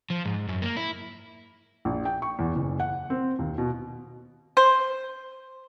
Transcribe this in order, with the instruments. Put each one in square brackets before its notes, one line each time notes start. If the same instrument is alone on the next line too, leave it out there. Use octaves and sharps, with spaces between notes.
[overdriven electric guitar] F3
G#2
F#2
A#3
E4
[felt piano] A#1
G5
C#6
E2
F#1
F#5
C4
D#2
B2
[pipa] C5